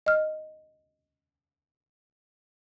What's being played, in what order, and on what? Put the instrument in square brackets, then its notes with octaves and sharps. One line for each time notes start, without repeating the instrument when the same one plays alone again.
[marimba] D#5 F6